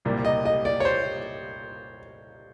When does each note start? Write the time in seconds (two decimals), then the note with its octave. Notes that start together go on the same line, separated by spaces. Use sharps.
0.05 C2 A#2 G3 A#3
0.25 D#5
0.45 D#5
0.65 D5
0.80 C#5
0.85 C5